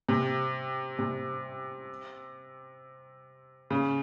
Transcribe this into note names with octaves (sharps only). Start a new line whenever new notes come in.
C3
C3
C#3